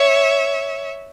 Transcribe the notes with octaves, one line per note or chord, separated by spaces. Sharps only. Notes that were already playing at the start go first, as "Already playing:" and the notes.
Already playing: C#5 E5